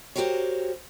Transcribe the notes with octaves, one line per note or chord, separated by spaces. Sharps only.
F#4 G4 A#4 C5 C#5